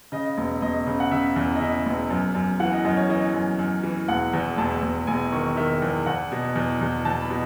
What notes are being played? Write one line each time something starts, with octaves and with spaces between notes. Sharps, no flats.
C#3 D#5
E1
E1 D#5
C#3
F#5
C#3 E5
E2
D#5
C#3 E5
E1
F#2
F#2
E3 F#5
D#5
F#2 D#5
C#5
E3 D#5
F#2
F#2
E3
E1 F#5
E2
E1 A5
E1
E1 G#5
D#3 C#6
D#3 E5
E2
E2 F#5
B2
E2
E2
E2 A5
B5
B2